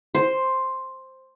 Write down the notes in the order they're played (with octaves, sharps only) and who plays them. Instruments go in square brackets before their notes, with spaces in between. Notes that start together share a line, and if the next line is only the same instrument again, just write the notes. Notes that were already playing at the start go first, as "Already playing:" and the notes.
[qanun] C5